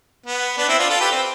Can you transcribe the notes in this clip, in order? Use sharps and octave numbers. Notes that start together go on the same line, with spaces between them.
B3
B3 D4
C4 E4
D4 F4
F4 A4
G4 B4
C4